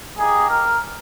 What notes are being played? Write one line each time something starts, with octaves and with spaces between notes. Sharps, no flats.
A#3 D#4 G4 G#4
A#4